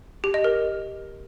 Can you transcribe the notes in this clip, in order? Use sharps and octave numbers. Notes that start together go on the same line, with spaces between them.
G4
D#5
A#4